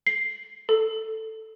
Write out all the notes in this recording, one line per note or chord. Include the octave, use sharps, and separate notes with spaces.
C7
A4